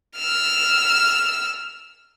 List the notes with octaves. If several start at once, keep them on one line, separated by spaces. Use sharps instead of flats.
E6 F6